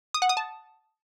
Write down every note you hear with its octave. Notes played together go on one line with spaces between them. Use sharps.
D#6
F#5
D#6
A5